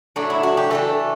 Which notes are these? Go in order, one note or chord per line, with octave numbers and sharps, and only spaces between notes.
A2 F#3 A3 D4 F#4
E4
F#4
G4
E3 A3 D4 A4